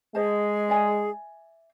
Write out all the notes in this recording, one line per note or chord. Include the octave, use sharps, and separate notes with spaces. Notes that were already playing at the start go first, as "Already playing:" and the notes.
G#3 G#4 C5 D#5 A5
D5 E5 G#5